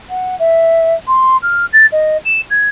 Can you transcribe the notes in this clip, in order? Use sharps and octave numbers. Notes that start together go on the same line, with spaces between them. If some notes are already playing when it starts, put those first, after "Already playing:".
F#5
E5
C6
F6
A6
D#5
E7
G#6